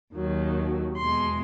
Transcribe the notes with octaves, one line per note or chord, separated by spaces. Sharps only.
D#2 D#3 F#3
E2 B2 G#3 C6